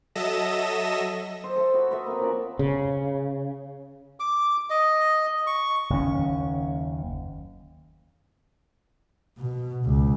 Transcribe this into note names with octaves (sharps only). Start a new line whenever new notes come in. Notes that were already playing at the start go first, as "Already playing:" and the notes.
F#3 A4 D#5 E5 A#6 E7
C5
A4 D#5 E5
F#4 B5
B4 D#5 E5
A#3 C4
F3 C#4 D5
C#3
D6
D#5
C#6
F#1 D#2 C#4
B2
C#2